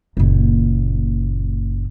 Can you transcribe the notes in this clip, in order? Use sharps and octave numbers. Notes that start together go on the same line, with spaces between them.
F#1 A#2